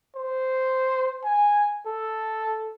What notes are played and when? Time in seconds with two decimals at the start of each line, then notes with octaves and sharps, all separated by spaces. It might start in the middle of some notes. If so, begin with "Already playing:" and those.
0.16 C5
1.24 G#5
1.86 A4